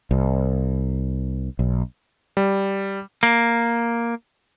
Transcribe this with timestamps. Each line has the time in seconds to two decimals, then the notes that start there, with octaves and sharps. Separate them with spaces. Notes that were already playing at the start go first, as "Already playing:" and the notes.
0.11 C2
1.59 B1
2.37 G3
3.23 A#3